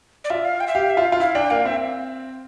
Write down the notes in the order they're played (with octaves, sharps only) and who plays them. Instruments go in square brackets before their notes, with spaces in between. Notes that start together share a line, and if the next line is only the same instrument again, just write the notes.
[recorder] D5
[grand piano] F4 [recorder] E5
[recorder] F5
G5
E5
[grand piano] G4 [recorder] F5
[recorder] E5
[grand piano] F4
[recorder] F5
[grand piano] F4
[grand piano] E4 [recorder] F5
[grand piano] D4 [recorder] G5
[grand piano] A#3 [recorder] F5
[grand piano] C4 [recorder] E5